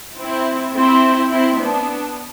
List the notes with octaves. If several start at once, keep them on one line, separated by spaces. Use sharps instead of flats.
C4 E4
C4 E4
C4 E4
B3 D4